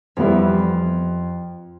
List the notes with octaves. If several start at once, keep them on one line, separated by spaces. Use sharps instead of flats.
F2 E3 G3 B3 E4